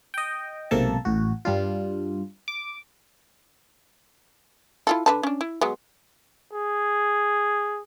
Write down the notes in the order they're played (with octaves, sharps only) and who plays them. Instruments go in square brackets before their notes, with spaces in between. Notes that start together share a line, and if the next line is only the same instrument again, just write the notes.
[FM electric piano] D#5 G5
B1 G#2 C3 A#3 A4 A5
A1 A2 F#4
G2 G3 D4 F4
D6
[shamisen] E4 F4 A4
D3 B4 A5
C#4 D4
E4
F#3 G#3 B3
[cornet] G#4